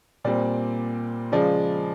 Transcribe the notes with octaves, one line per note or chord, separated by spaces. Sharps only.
A#2 G3 C4 D5
C#3 F3 G#3 D5